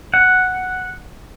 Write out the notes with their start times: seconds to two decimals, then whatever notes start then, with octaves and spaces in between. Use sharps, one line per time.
0.14 F#5